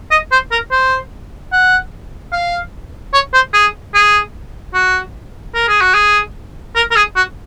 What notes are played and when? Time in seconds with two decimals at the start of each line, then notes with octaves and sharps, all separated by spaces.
0.11 D#5
0.32 C5
0.52 A#4
0.72 C5
1.53 F#5
2.33 F5
3.14 C#5
3.34 C5
3.54 G#4
3.94 G#4
4.74 F#4
5.55 A#4
5.68 G#4
5.81 F#4
5.94 G#4
6.76 A#4
6.91 A#4
6.96 G#4
7.16 F#4